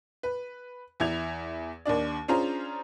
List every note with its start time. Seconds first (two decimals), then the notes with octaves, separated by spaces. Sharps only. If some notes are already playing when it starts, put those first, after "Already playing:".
0.23 B4
1.00 E2 E4 G#6 F7
1.86 D#2 D#3 D4 D5
2.28 C#4 D4 F4 G#4 C5 A#5